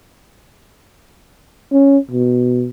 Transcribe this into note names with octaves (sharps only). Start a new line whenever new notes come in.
C#4
B2